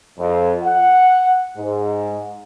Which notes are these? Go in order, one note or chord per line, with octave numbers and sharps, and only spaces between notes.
F2
F#5
G#2